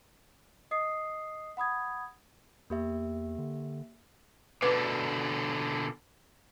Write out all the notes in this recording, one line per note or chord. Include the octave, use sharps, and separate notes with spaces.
D#5 D#6 C7
F#5 B5 D#6 G#6
E2 A#3 G4 E5
D3
B2 D3 B4 D6